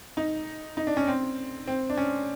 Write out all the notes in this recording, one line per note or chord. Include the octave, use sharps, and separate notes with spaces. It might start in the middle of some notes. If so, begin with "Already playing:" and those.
D#4
D#4
D4
C#4
C4
C4
D4
C#4